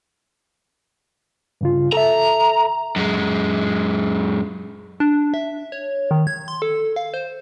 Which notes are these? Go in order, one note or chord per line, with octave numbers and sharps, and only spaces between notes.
G2 C#3 F4
A4 E5 A#5
F#2 G#3
D4
E5
C#5
D#3
G#6
C6
A4
F5
C5